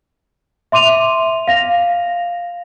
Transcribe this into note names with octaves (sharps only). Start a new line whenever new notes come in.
E5 C6 D6 D#7 F7
F5 A#6 F7